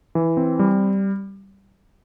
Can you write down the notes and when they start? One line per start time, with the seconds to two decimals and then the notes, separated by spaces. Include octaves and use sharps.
0.15 E3
0.37 C4
0.59 G3